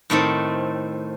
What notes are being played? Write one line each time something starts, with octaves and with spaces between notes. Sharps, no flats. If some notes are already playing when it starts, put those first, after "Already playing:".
A2 D#3 A3 C4